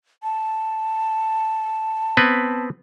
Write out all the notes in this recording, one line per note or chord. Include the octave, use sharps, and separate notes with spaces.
A5
B3 C4 B4